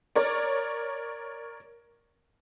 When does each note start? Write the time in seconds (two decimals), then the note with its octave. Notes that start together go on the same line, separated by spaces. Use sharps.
0.16 A#4 C#5 D5